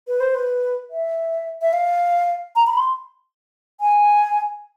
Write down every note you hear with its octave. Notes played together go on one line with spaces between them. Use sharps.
B4
C5
B4
E5
E5
F5
A#5
B5
C6
G#5